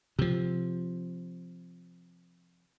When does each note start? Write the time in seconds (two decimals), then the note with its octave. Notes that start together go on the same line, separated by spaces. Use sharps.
0.19 C3 F3